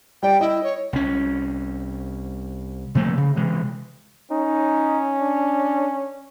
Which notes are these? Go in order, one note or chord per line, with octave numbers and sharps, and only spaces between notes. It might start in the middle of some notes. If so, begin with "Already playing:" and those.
G3 D5 G5
E4 D#5
C#5
C2 C#4
C3 F3 A3 A#3
C#3
C3 E3 G#3
C#4 D#4
D4